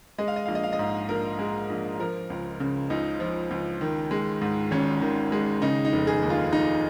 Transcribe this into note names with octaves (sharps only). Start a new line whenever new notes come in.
G#3 D#5
F5
D#5
A#1 F5
D#5
F5
D#5
G#2
A#1 A#4
G#3
A#1
F3 A#4
C#2
C#3
C#2 D#4
F3
C#2
D#3
G#3
G#2
G#1 C#4
D#3
G#3
C#3 D#4
D#4
F1
G#4
D#2
F4
F1 D#4